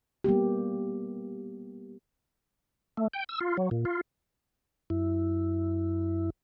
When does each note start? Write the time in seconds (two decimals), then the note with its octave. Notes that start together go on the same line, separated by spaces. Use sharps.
0.24 G3 A#3 B3 G4
2.97 A3
3.14 G5
3.29 E6
3.41 F4
3.57 F#3
3.71 A#2
3.85 F4
4.90 F#2 E4